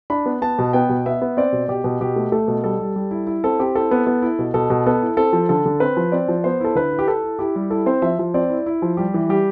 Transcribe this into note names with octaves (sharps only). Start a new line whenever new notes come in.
D4 B5
B3
B3 A5
B2
B3 G5
B2
B3 E5
B3
C4 D5
B2
B2 G4
B2
B2 G4
A3
A3 A4
B2
G3 A4
G3
G3
E4
E4
C4 A4
C4 G4
E4 A4
B3
B3
E4
B2
B2 A4
B2
B3 A4
E4
C4 A4
F3
D3 A4
D3
C4 B4
F3
C4 D5
F3
B3 C5
E4 A4
D3 B4
E4
G4
E4 A4
E4
E4 G4
G3
E4 A4
C4 C5
F3 E5
F3
C4 D5
E4
E4
F3
G3 G4
E3
G3 G4